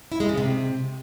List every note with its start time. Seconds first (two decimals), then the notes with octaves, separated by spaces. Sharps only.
0.12 E4
0.20 G#3
0.29 C#3
0.38 C3